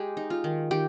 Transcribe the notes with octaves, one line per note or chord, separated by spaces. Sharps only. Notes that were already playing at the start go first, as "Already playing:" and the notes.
Already playing: G#3 G4
D#4
F4
D#3
D#3 G4